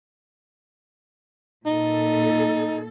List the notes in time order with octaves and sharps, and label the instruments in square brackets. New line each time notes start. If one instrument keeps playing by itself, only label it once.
[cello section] A#2 A4 [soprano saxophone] D#4